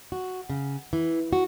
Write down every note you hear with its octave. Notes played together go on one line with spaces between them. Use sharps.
F#4
C#3
E3
F#4